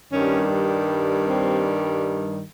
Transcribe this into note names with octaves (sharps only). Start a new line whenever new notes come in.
G2 D#3 G3 C#4
C4